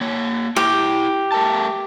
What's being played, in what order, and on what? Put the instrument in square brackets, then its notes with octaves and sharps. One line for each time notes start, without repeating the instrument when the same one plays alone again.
[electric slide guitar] A#3 C#5
[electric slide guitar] E4 G5 [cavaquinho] G4
[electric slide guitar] A3 A#4 A5